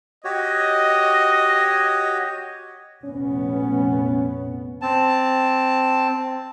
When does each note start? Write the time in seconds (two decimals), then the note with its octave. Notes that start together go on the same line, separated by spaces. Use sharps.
0.24 F#4 G4 C#5 D#5
3.05 F1 A#1 B3 C#4
4.81 C4 A5